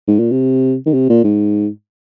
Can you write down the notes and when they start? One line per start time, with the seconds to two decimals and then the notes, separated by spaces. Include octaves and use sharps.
0.07 G#2
0.19 A#2
0.32 C3
0.86 D#3
0.94 C3
1.09 A#2
1.24 G#2